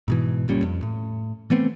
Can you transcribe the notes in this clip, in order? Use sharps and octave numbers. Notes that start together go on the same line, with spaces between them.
G#2 B2 E3
F#1 A#2 G3 C#4
F2
A2
E3 A3 B3 C4